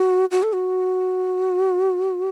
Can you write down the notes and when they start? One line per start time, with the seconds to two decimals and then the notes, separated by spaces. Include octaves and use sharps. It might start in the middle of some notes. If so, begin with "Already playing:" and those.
Already playing: F#4
0.31 F#4
0.43 A4
0.54 F#4